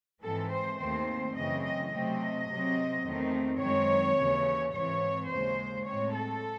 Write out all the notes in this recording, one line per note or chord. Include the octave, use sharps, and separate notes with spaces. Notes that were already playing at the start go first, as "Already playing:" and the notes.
G#2 E3 G#3 C4 A4
C5
D#2 D#3 A3 C4 C5
F#2 C#3 E3 A3 C4 D#5
D#5
C3 F#3 A3 C4 D#5
C3 F#3 C4
E2 D#3 A3 C4
F#2 D#3 G#3 C4 C#5
D#2 C#3 E3
G#2 E3 C4 C#5
D#2 C#3 G#3 C5
A2 G#3 C4 C#5
A4